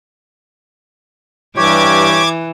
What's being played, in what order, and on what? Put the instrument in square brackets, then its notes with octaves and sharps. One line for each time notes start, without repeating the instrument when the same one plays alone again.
[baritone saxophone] G2 [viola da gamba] E3 [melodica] G4 C#5 [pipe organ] D6 G#6